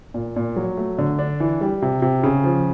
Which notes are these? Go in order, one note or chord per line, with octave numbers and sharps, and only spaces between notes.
A#2
A#2
F#3
A3
D3
D4
E3
G3
C3
C3
C#3
F3